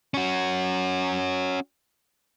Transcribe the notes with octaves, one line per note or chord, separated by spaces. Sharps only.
C#4 F#4